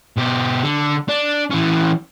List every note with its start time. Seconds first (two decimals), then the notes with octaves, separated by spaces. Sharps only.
0.18 B2 G4
0.64 D3
1.09 D4
1.50 E3 C#4